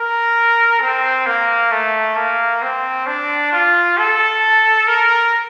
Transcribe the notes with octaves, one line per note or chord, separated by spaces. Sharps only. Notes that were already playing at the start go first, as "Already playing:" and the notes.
Already playing: A#4
C4
A#3
A3
A#3
C4
D4
F4
A4
A#4